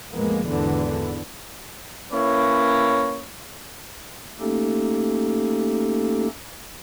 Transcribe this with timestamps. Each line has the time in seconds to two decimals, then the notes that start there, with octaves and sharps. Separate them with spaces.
0.11 A1 F2 G#3 A#3 B3
0.48 G#1 E2 D3 E3 B3
2.12 A#3 C#4 E4 B4 C#5
4.40 A3 A#3 C#4 D#4 G4 A4